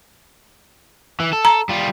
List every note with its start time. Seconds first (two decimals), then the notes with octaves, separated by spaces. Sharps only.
1.20 E3
1.33 A4
1.45 A#5
1.69 G3 F4